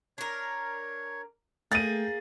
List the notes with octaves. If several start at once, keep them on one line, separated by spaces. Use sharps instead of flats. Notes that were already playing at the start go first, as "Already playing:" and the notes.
D4 A#4 C#5
A3 A#3 G#4 G5 A6 D#7